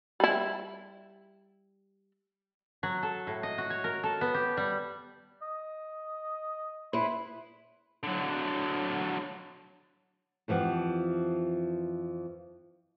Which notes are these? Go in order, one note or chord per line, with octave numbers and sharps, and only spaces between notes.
G3 E4
F#3
A4
A2
D#5
F#4
C#5
A#4
A4
B3
G4
G3
D#5
E4 B4 C6
D3 F#3
F2 E3 F3 G4 F#5